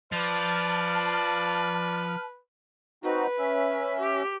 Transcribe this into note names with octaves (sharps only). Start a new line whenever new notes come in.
F3 B4 D5 A5 F6
C4 D#4 F#4 B4
C#4 E5
G4